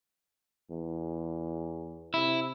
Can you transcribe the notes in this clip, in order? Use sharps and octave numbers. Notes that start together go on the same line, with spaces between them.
E2
C3 E4